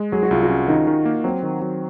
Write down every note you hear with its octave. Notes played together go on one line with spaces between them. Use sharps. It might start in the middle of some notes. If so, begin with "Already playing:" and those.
Already playing: G#3
F#3 G#4
F#4
C2 F4
F#4
C#4
D#3 D#4
D#3
A#3
F#3 C4
D#3
F#3